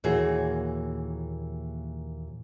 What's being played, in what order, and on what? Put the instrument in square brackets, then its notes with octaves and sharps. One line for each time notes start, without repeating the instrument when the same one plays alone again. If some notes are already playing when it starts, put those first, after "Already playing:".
[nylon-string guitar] D#2 A#2 E3 F#4 G#4 C#5